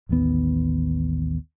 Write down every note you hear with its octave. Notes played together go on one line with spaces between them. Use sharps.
A1 D#2 D#3 B3